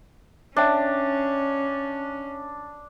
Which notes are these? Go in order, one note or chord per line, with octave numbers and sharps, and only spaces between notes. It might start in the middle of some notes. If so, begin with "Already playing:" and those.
C#4 D4 C#5 E5 G5